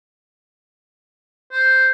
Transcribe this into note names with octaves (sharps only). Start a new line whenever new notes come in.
C5